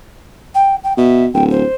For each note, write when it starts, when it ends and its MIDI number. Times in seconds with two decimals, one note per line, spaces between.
0.55 0.75 79
0.83 0.93 79
0.97 1.28 47
0.97 1.26 76
1.34 1.64 26
1.34 1.44 79
1.50 1.75 72